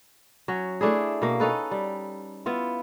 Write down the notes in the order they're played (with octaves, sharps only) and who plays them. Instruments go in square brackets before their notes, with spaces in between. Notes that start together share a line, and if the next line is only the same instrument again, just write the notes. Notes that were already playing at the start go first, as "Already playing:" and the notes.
[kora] F#3 C#4
A3 D4 E4 G#4
B2 A#3
C#4 D#4 A4 B4
G3
B3 E4 F4